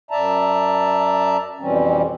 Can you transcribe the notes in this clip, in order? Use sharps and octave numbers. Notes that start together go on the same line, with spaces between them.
F#2 D5 E5 A5 A#5
F2 B2 E3 G3 C4 C#4